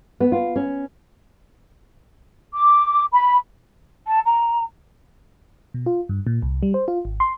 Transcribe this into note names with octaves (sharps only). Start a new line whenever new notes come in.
B3
F4
C#4
D6
B5
A5
A#5
B2
F4
G2
A#2
C2
G3
C5
F4
G#1
C6